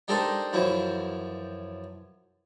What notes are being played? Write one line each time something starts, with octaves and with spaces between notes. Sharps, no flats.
D4 D#4 G4 A4 A#4 C5
F#2 E3 F3 E4